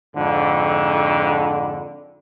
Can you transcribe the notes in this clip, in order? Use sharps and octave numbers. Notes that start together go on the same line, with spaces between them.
F2 G#2 D3